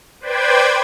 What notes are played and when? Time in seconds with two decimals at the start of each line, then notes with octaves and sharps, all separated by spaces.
0.20 B4 C5 D5 G5 G#6